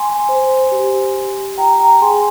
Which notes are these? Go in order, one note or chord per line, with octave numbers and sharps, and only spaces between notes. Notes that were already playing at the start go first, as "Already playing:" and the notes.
Already playing: G#5 C6
C5
G4
G4
F4 G5 A#5
G5 A#5
G#4 G#5 C6